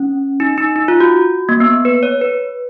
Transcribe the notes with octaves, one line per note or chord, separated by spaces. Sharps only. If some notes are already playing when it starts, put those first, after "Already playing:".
Already playing: C#4
D#4
D#4
D#4
F4
F#4
A#3
B3
B4
C#5
B4